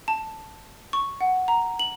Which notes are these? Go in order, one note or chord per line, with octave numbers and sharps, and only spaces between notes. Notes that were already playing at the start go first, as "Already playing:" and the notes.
A5
C#6
F#5
A#5
F#7